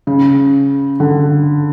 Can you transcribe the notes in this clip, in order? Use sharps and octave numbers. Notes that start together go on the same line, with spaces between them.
C#3
D3